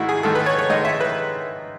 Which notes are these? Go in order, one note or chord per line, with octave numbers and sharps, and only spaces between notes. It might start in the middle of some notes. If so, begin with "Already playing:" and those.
Already playing: G#2 D#3 A3 E4 F#4
G#4
G#2 D#3 A3 A4
B4
C#5
C#5
G#2 D#3 A3 D#5
E5
B4